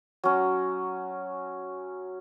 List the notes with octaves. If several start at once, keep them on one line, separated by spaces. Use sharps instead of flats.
F#3 C#4